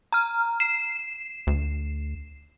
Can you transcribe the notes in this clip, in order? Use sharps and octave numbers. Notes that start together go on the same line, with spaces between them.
A#5 F6
C7 E7
D2